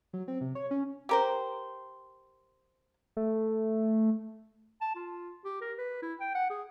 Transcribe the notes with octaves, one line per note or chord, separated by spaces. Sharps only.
F#3
C4
C3
C#5
C#4
G4 A#4 C5
A3
A5
F4
G4
A#4
B4
E4
G5
F#5
G#4